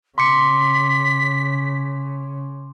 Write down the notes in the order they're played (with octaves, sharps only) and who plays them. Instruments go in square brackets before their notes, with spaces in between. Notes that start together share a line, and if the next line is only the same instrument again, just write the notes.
[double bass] C#3 [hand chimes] C6 D6 C#7 [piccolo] B6